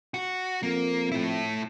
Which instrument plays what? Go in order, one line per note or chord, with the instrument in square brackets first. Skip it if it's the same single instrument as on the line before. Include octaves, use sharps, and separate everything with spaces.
[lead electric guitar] F#4
[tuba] F2 [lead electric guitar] A#3
[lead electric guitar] A3 E4